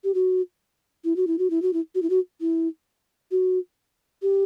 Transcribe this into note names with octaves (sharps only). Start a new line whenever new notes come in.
G4
F#4
E4
F#4
E4
F#4
E4
F#4
E4
F#4
E4
F#4
E4
F#4
G4